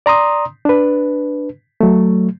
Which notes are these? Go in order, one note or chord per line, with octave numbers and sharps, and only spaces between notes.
D5 A#5 C6 D#6
D4 B4
F#3 A3